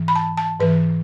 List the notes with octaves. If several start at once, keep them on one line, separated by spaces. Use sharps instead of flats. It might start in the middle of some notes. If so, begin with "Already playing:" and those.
Already playing: G#2 E3
B5
A5
A5
G#2 E3 B4